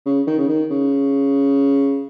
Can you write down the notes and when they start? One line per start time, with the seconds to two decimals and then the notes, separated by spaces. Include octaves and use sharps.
0.06 C#3
0.27 D#3
0.38 C#3
0.49 D#3
0.70 C#3